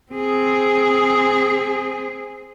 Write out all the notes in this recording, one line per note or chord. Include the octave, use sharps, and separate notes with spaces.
C4 G#4